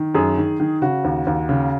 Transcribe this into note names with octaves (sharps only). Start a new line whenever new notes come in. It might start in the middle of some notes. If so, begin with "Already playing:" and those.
Already playing: D#3
F#2 G#4
D#3
D#3
C#3 F#4
D#2
D#2
C#3